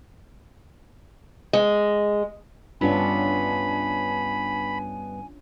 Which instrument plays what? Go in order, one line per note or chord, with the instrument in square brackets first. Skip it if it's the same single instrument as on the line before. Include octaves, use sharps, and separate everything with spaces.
[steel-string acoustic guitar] G#3
[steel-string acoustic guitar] G2 B3 E5 [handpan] C#4 D4 F4 [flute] G#5 [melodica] B5